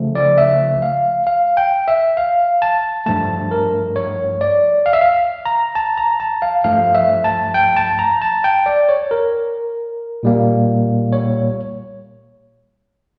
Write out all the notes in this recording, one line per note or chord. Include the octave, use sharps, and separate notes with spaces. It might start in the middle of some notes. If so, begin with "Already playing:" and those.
Already playing: C#3 F3 A3
D5
E5
F5
F5
G5
E5
F5
A5
G2 F3 A3 A5
A#4
C#5
D5
F5
E5
F5
A#5
A5
A#5
A5
F5
G2 F3 A3 F5
E5
A5
G5
A5
A#5
A5
G5
D5
C#5
A#4
A#2 G3 A#3
C#5